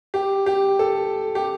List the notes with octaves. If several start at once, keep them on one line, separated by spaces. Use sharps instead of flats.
G4
G4
A4
G4